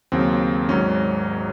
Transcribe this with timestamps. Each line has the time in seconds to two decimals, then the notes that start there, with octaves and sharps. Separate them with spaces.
0.12 D#2 C#3 F#3 C4
0.69 G#1 G#2 F#3 C#4